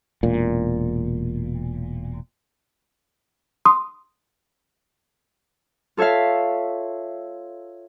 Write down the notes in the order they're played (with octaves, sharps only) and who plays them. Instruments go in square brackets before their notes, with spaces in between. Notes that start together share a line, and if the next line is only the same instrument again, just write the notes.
[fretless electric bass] E1 A#2
[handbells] C6 D#6
[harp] F4 A4 C#5 E5 F5